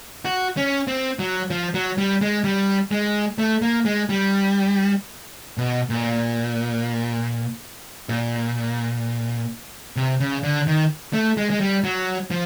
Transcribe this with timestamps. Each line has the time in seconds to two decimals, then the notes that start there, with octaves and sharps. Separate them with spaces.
0.25 F#4
0.57 C#4
0.88 C4
1.19 F#3
1.50 F3
1.74 F#3
1.98 G3
2.21 G#3
2.44 G3
2.91 G#3
3.38 A3
3.62 A#3
3.85 G#3
4.09 G3
5.58 B2
5.90 A#2
8.09 A#2
9.96 C3
10.20 C#3
10.44 D3
10.67 D#3
11.13 A3
11.37 G#3
11.50 G#3
11.61 G3
11.84 F#3
12.31 F3